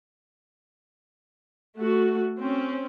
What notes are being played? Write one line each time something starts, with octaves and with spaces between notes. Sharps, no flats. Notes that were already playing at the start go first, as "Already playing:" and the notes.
A3 F#4
C4 C#4